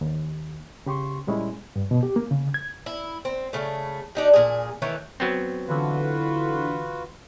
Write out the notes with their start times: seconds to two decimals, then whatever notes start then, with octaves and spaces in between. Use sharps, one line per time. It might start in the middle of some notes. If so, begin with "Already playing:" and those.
0.01 D#2
0.86 C#3 G4 C6 C#6
1.27 A#2 G3 G#3 C#4 E4
1.76 G2
1.91 B2
2.03 G4
2.16 A#3
2.31 C#3
2.54 G#6
2.86 E4
3.25 C4
3.53 C#3 A3
4.15 D4 D#4 G4
4.34 A#2 G#4
4.82 D#3 E3 A3 C#5
5.20 F#3 B3 C4
5.68 D3 E3 F4 F#4 B4